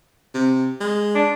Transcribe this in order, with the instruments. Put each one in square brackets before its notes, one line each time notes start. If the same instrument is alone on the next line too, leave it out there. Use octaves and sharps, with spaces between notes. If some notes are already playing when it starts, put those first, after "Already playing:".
[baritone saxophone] C3
G#3
[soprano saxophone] D4